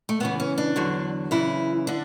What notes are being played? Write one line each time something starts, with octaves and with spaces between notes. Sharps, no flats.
A3
E2 C#3 E3 B3
C#4
D4
E2 D3 F#3
F#2 C#3 E3 E4
D3 D4